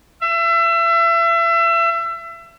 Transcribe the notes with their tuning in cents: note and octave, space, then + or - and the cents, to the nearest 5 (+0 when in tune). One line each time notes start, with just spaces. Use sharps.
E5 +30